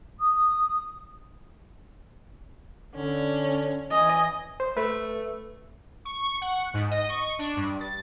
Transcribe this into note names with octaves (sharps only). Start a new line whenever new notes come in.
D#6
D3 C#4
E3 D#5 G#5
C5
A3 B4
C#6
F#5
G#2
D#5
C#6
D4
G2
A6